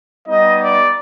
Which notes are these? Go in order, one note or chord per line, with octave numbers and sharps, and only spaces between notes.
G3 B3 D#4 D#5
D5